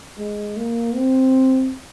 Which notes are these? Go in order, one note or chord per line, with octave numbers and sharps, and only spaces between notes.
G#3
A#3
C4